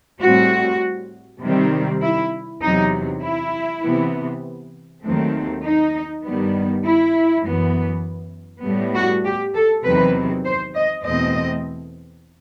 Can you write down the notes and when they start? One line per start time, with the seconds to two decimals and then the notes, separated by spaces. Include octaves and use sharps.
0.21 A2 G3 C4 F#4
1.42 C3 D#3 G3 C4
2.02 E4
2.62 E2 C3 F#3 D#4
3.22 E4
3.82 C3 E3 B3
5.03 D#2 D#3 F#3 A3 C4
5.63 D#4
6.23 G2 D#3 G3 B3
6.84 E4
7.44 F#2 E3 B3
8.64 A2 G3 B3
8.94 F#4
9.24 G4
9.54 A4
9.84 E2 C3 D#3 F#3 C4 B4
10.44 C5
10.74 D#5
11.04 E2 B2 A3 C4 D#5